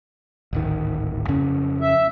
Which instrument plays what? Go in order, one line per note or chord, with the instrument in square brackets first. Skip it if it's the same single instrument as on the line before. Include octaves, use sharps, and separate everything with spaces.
[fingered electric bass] D1 G#1 D#3
F2 C#3 C#4
[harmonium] E5